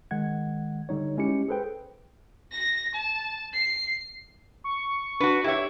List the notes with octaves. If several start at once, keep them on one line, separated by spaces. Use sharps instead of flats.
D#3 G#3 F#5 G#6
D3 G3 D#4 C#5
G#3 C#4 E4 G4 C#7
G#4 A4 B4 C5 G5
A#6
A5
C7
C#6
D4 F#4 B4
E4 G4 C#5 E5